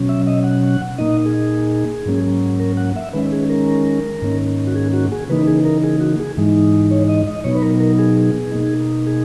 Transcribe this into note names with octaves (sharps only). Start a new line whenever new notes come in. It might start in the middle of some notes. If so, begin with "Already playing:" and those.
Already playing: B2 F#3 C#4
E5
D#5
F#5
A#2 A#3 D#4 D#5
G#4
G#2 F#3 A#3 C#4
A#4
F#5
E5
D#3 G#3 C#4 B4
G#4
A#4
G#2 D#3 A#3 C#4
F#4
G#4
F#4
G#4
C#3 E3 A#3 D#4 B4
G#4
A#4
G#4
F#4
G#4
G#2 E3 G#3 D#4
C#5
D#5
D#5
B2 F#3 B3 D#4 C#5
B4
A#4
A#4
G#4
B2 A#3 D#4
G#4